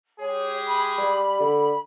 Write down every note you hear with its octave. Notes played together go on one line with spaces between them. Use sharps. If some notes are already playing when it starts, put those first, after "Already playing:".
G#3 G4 G#4 C#5
B5
G3
D3